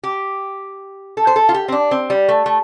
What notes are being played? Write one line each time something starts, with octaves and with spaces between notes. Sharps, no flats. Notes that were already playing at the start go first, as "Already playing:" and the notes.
G4
A4
C5
A4
F4
G4
C4
D4
C4
G3
A3
A3